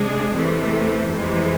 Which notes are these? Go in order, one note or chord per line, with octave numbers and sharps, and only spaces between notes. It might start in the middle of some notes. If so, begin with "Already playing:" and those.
Already playing: C3 G#3 D4 G#4
E2 C3 E3 A3
F2 C3 E3 G#3